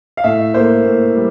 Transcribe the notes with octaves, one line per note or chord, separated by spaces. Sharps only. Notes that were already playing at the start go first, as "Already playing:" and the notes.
F5
A2 E5
A#3 C5
A2
G3